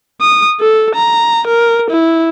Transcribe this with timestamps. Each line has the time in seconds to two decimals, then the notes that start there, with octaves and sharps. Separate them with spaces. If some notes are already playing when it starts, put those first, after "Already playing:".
0.21 D#6
0.60 A4
0.95 A#5
1.47 A#4
1.90 E4